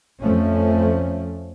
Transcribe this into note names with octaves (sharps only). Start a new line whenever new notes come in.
F2 F3 A3 C#4